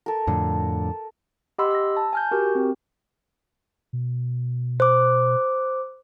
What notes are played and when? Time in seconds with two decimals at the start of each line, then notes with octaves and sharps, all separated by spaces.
0.06 A4 A#4
0.27 F2 A2 D3
1.59 G4 D#5 F#5 B5 C6 E6
1.71 E6 A#6
1.97 A5
2.13 G#5 F6 G6
2.31 F#4 G4 A#4
2.55 C4
3.93 B2
4.80 C5 D6